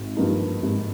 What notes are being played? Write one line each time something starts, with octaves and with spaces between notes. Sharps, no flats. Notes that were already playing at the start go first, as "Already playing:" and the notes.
Already playing: G#1
G2 F3 A#3 D#4
G#1